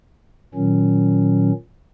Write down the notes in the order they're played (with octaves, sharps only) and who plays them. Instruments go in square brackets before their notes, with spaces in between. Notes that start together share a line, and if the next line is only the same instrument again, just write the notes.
[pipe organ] A#2 D#3 F#3 C#4